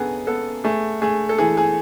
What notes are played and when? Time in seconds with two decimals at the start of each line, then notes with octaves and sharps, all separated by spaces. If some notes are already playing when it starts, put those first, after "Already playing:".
Already playing: F#2 C#3 B3 G#4 A4
0.27 B3 A4
0.64 A3 G#4
1.02 A3 G#4
1.29 A4
1.38 E3 G#4
1.57 G#4